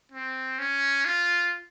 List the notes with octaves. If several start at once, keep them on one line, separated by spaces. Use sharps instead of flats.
C4
C#4
F4